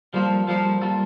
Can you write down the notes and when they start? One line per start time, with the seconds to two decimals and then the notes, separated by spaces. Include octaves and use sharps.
0.14 F3 G3 A#3 F4 A4
0.48 F3 G3 A#3 F4 A4
0.82 G3 A#3 F4 A4